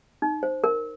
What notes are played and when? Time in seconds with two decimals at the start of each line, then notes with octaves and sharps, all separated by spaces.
0.22 D#4
0.43 C5
0.64 A#4